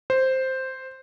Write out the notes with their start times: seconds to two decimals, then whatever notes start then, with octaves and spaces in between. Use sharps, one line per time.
0.10 C5